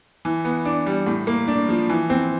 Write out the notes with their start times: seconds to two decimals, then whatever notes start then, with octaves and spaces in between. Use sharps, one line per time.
0.25 E3
0.45 B3
0.65 D4
0.86 G3
1.07 A2
1.27 A#3
1.48 D4
1.69 F3
1.90 E3
2.10 C4